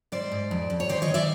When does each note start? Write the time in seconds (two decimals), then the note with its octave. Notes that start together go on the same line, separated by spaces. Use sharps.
0.12 G#2 C5 D5
0.31 G#2
0.51 F2
0.70 F2
0.80 C#5
0.89 D#3 C5 D5
1.02 C#5 D#5
1.08 D#3
1.14 D5 E5